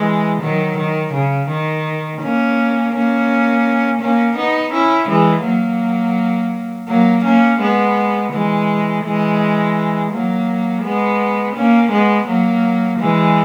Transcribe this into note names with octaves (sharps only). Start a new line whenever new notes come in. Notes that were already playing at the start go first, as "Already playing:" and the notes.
Already playing: E3 G#3
D#3 F#3
D#3
C#3
D#3
A#3 C#4
A#3 C#4
A#3 C#4
B3 D#4
C#4 E4
E3 G#3
F#3 A#3
F#3 A#3
A#3 C#4
G#3 B3
E3 G#3
E3 G#3
F#3 A#3
G#3 B3
A#3 C#4
G#3 B3
F#3 A#3
E3 G#3